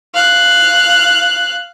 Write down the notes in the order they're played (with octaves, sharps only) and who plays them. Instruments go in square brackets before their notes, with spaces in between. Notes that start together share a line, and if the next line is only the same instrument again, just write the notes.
[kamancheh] F5 F#6